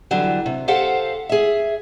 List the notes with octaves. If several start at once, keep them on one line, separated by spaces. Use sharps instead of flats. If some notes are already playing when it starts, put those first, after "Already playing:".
D3 E3 F#3 G3
C3
G4 A4 C5 F5 F#5
G#4 E5